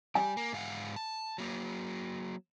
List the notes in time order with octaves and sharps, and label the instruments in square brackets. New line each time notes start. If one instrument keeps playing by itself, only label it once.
[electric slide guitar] G3 G4 [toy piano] G#5
[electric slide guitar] A#3
G#2 F5 F#5
A5
F#3 A#3